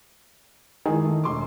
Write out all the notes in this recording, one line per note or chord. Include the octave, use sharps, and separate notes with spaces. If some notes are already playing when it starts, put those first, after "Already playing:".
D#3 E3 G#3 G#4
A3
E1 C6 D6